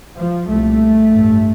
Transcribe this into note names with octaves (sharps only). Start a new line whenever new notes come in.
F3
C2 A#2 A3
A1 G2